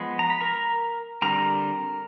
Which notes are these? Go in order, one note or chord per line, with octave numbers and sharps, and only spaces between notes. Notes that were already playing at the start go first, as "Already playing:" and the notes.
Already playing: F3 G#3 B3
A#5
B5
A#4 A#5
D3 G3 C4 A#4 A#5